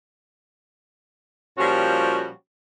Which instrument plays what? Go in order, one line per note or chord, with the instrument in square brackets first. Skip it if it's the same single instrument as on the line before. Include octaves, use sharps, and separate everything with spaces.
[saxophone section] A#2 F3 G3 C#4 F#4 G4